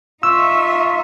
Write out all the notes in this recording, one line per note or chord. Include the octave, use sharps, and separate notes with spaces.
D#4 F4 E5 C#6 E6